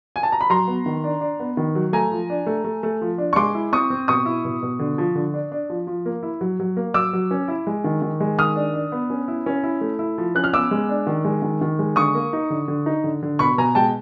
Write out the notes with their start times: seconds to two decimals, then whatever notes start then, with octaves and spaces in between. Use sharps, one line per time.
0.16 G#5
0.23 A5
0.32 A#5
0.41 B5
0.50 F#3 A#5 C6
0.67 B3
0.86 D#3
1.04 D4
1.21 D4
1.40 B3
1.57 D#3
1.75 F#3
1.93 A3 G#5 A#5
2.12 F3
2.30 D4
2.47 A3
2.64 A3
2.83 A3
3.01 F3
3.18 D4
3.33 C#6
3.36 G#3 C6 D6
3.55 E4
3.72 C4 C#6 D#6
3.90 C4
4.08 B2 C#6 D#6
4.26 E4
4.45 B2
4.62 B2
4.79 D3
4.98 F3
5.15 D3
5.34 D4
5.52 D4
5.70 F3
5.87 F3
6.06 A#3
6.23 E4
6.41 F#3
6.60 F#3
6.77 A#3
6.94 F#3 D6 E6
7.13 F#3
7.31 C#4
7.48 E4
7.67 G#3
7.84 D#3
8.02 D#3
8.20 G#3
8.38 D#3 D#6 F6
8.56 D4
8.74 D4
8.92 B3
9.10 C#4
9.28 E4
9.46 C#4
9.63 E4
9.81 A3
9.99 E4
10.18 F3
10.35 C#4 F#6
10.44 F6
10.53 B3 D6 E6
10.71 G#3
10.89 D4
11.07 D#3
11.25 G#3
11.42 D#3
11.61 D#3
11.79 G#3
11.96 D3 C#6 D#6
12.15 A#3
12.33 D#4
12.50 D3
12.68 D3
12.86 D#4
13.04 D3
13.23 D3
13.39 B2 B5 C#6
13.58 B2 G#5 A#5
13.75 G#3 G5 A5